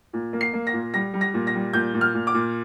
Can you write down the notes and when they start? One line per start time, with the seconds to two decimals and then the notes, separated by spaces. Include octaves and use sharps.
0.13 A#2
0.33 A#3
0.41 C7
0.54 A#3
0.67 A#6
0.73 A#2
0.94 G3 A#6
1.14 G3
1.21 A#6
1.34 A#2
1.47 A#6
1.55 G3
1.73 A#2 G6
1.94 A#2
2.01 F6
2.14 A#2
2.27 D6
2.34 A#2